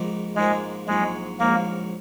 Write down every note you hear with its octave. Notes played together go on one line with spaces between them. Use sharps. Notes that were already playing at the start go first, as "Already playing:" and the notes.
Already playing: A#1 G#2 F3 A#3
A#1 G#2 F3 G#3 A#3
A#1 G#2 F#3 G#3
A#1 G#2 F#3 A#3